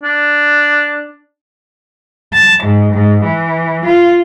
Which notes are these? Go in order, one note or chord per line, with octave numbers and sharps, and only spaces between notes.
D4
A5
G#2
G#2
E3
F4